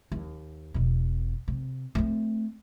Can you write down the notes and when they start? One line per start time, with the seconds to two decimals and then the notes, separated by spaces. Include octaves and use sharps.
0.12 D#2
0.74 E1 B2
1.48 C3
1.95 A3 C4